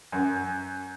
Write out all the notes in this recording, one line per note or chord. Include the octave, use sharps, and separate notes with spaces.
F#2